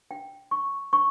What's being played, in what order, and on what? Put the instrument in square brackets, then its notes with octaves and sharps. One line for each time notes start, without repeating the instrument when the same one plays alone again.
[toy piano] G5
C#6
C#6